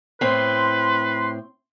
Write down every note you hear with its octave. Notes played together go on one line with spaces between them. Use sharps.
A2 C4 B4 C6